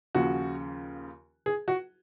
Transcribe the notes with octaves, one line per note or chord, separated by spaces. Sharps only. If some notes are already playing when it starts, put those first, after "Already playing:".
D#2 C#3 F3 F#4
G#4
F#4